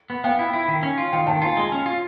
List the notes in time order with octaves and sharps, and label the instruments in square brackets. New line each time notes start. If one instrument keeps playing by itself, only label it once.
[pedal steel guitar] B3
[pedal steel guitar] B3 [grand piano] F5 G5
[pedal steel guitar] E4
E4
D#3
C#4
F4
[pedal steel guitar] D#3 [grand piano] F5 G5
[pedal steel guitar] D#3 [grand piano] G5 A5
[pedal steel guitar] F4 [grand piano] G#5 A#5
[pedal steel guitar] G#3 [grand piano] G#5 A#5
[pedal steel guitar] C#4
F4